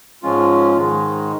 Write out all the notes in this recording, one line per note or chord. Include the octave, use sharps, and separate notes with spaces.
G#2 F3 G#3 C#4 F4
G#2 D#3 G#3